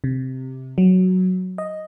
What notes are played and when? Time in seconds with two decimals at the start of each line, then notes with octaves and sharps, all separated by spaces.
0.04 C3
0.78 F#3
1.58 D#5